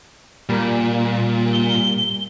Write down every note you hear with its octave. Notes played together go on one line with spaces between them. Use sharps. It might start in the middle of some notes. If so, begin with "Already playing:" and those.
A#2 G3 A#3
G7